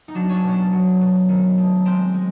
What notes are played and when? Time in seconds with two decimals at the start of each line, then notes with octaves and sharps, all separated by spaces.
0.08 D#4
0.15 F#3 D4
0.29 C#4 D4
0.44 B2 C#4
0.53 D4
0.72 F#3
1.01 B2
1.28 D#3
1.58 A3
1.85 G#3 C4
2.14 G#3